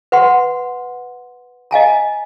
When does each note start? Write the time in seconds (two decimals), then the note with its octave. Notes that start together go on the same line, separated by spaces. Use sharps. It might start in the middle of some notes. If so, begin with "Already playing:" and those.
0.12 B4 F#5 C6
1.71 D#5 F5 G#5 A#5